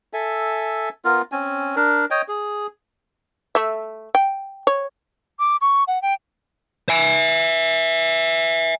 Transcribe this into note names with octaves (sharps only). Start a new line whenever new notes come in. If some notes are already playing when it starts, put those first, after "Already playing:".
A4 E5 G#5
B3 F4 A#4
C4 C#4 G#5
D4 A#4
C#5 D#5 G5
G#4
A3 E5
G5
C#5
D6
C#6
F#5
G5
E5 G#5